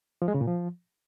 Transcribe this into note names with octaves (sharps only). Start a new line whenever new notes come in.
F3
G#3
C#3
A#2
F3